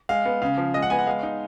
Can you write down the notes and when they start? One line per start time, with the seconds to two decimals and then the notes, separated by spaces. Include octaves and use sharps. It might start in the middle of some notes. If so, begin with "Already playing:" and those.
0.09 G#3 F5
0.25 B3
0.42 C#3 F5
0.58 F3
0.74 G#3 D#5
0.82 F#5
0.90 B3 G#5
0.99 F#5
1.06 G#3 F5
1.23 D#4